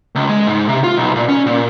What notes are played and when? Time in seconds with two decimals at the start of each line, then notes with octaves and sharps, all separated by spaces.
0.15 C#2
0.29 G#3
0.47 G#2
0.69 C3
0.84 F4
0.97 B1
1.16 A#2
1.29 C#4
1.46 A#2